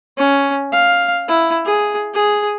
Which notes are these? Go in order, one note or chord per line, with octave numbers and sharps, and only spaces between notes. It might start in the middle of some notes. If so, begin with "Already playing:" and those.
C#4
F5
E4
G#4
G#4